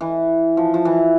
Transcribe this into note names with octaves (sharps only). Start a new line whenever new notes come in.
E3
F3
F3
E3